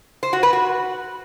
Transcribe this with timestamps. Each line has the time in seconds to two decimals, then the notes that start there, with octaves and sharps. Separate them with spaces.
0.23 C5
0.33 F#4
0.43 B4
0.53 F#4